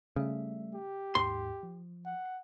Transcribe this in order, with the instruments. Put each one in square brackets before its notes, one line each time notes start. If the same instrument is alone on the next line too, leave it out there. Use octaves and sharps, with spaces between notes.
[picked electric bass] C#3 [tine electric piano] G3 A3 E5
[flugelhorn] G4
[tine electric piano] D#2 G#2 [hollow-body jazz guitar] C6
[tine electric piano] F3
[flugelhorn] F#5